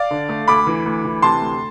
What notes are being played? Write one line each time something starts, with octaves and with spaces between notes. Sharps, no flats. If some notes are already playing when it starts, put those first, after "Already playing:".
Already playing: D5 F5
D3
A3
D2 B5 D6
E3
D2
E3
C3 A5 C6
D2